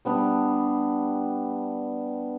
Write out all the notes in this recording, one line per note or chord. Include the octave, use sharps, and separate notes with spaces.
G3 B3 D4